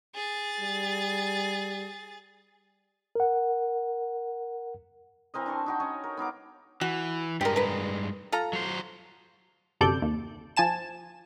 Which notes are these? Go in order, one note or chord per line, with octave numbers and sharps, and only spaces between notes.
G#4 A6
G3
A#4 F#5
E3 C4 A#4 D#5
D4 A5 C6 C#6
D#4 F#4 G5
C#4 C#5 D#5
A#4
B3 D#4 F5 D6
E3 F#4
G2 G#3 G4 A#4
A#4 B4
F4 A4 A#5
F#3 C5
G1 F#2 C3 A4 D5 G6
D#2
F3 G#5 A5 E7